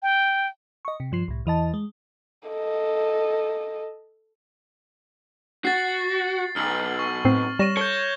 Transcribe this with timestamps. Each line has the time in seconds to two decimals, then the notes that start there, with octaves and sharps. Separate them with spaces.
0.02 G5
0.85 D#5 C#6
1.00 C3
1.12 G2 F3 C7
1.28 C2 A2
1.46 E2 E3 D#5 A5
1.74 G#3
2.49 A4 D#5
5.65 F#4 A6 C7
6.56 B1 F6 F#7
6.99 C#6
7.25 A2 C4 C7
7.59 G3 C#5 A#6 D#7 E7
7.77 A4 C#5 G6 G7